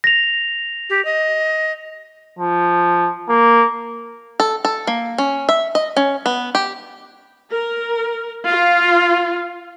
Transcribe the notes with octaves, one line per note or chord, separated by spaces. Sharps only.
A#6 F7
G4
D#5
F3
A#3
A4
A4
A#3
C#4
E5
D#5
C#4
B3
G4
A#4
F4